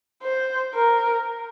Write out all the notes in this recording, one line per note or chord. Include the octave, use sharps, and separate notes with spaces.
C5
A#4